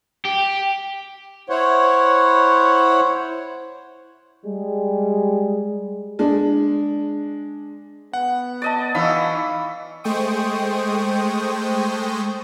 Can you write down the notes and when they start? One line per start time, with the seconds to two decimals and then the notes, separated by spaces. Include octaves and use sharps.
0.25 G4
1.50 E4 C5 C#5 F#5
4.46 G3 G#3
6.19 G#3 D4
8.13 B3 F#5
8.62 D5 D#5 A5
8.95 E3 F#3 D#4 F5 B5 E6
10.04 G#3 A3 C5 G5 C#6 D#6